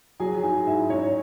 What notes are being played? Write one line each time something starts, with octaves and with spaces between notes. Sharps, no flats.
F#3 G#4 G#5
G#2 G#4 G#5
G#2 E4 E5
G#2 C#4 C#5